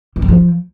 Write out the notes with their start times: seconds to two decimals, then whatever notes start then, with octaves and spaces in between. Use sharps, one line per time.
0.16 C#3
0.22 G3
0.28 F3